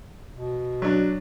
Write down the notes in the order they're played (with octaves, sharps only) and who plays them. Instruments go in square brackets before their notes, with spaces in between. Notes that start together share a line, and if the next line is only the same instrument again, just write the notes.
[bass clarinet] B2
[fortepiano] F#3 D4